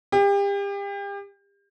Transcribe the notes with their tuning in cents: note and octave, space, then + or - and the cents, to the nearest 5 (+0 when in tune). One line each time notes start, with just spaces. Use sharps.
G4 +35